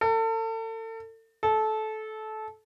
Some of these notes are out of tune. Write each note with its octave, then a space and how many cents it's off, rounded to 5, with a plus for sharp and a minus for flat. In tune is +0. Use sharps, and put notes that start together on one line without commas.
A4 +35
A4 -20